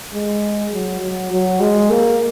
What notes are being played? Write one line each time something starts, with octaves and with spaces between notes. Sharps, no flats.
G#3
F#3
F#3
F#3
G#3
A#3